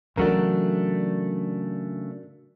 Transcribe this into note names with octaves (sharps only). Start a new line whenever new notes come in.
C#3 E3 F#3 A3 D4 F#4 A#4